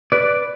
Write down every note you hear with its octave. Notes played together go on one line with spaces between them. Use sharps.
B4 D5